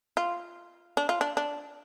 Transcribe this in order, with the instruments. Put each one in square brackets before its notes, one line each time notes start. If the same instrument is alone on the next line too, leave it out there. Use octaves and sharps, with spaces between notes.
[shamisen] F4
D4
F4
D4
D4